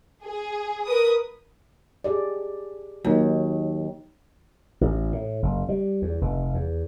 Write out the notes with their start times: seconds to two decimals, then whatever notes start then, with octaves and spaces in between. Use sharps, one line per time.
0.25 G#4
0.86 A#4 B4 D#6
2.04 G4 G#4 D5
3.04 D#2 F#3 D#4
4.81 A1
5.12 A2
5.42 F#1
5.69 G3
6.02 E2
6.21 F1
6.54 E2